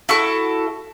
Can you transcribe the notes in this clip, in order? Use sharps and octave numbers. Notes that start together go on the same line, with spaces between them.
E4 F#4 A4 C#6